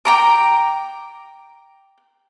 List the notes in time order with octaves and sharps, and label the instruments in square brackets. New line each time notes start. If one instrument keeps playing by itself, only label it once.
[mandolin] G5 A#5 D6